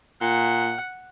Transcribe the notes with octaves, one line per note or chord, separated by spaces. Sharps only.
A#2 F#5